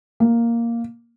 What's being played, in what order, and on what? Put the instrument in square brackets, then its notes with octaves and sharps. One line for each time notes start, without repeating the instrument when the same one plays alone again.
[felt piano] A#3